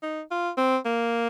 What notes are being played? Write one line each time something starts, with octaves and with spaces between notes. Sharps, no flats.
D#4
F4
C4
A#3